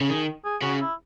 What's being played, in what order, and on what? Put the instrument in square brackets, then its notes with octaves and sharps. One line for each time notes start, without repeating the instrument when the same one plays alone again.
[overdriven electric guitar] C#3
[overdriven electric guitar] D#3 [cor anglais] G#4
[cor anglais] G#4
[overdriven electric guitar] C#3 [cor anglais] F#4
[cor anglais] E4